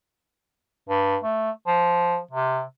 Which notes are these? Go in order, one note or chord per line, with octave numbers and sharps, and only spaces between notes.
G2
A3
F3
C3